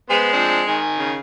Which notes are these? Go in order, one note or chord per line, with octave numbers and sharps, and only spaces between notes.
G#3 B3 C5
F3 C4 D4
D#3 G#5
C#3